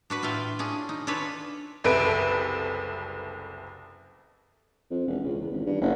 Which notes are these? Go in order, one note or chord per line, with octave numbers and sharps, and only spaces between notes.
D4 F#4 B4
A2 F4 E5 F5 G5
C#4 D4 G#4
D#4
D4 F4 A4 B4 C#5
F#1 C2 A4 B4 D7
F2
E1
C#2
E2
G#1
G2
F#1